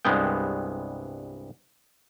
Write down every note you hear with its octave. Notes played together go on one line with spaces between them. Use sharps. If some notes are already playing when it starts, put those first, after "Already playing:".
C2 G2 G#3 B3 G5